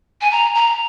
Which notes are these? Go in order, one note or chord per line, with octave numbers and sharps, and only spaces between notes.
G#5
A#5
A#5